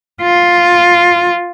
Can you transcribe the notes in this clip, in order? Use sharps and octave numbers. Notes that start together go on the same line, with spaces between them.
F4